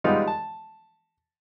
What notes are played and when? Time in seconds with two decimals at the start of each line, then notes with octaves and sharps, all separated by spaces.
0.04 G3 G#3 B3 D#4 F4
0.27 A5